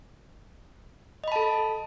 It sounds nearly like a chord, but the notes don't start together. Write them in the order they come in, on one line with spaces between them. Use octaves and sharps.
D#5 B5 A5 A4